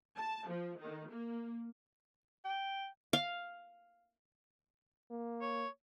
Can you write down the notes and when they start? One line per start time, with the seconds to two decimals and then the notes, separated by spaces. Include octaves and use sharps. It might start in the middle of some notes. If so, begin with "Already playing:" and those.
0.17 A5
0.49 F3
0.79 D#3
1.09 A#3
2.45 G5
3.13 F5
5.11 A#3
5.41 C#5